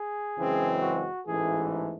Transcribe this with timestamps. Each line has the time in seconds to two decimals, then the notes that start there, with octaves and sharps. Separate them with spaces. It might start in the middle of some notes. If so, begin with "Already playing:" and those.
Already playing: G#4
0.36 F#2 C#3 E3 G#3 C4
0.81 F#4
1.26 A1 G#2 E3 A3 G#4